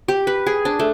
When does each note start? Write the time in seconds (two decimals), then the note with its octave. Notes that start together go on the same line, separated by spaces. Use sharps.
0.08 G4
0.27 B4
0.47 G#4
0.65 D4
0.79 A3